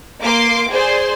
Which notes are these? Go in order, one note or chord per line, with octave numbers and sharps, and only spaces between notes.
A#3 C6 D6
G#4 C5 D5 C6